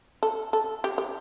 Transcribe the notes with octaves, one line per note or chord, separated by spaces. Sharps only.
A4
A4
G4
G4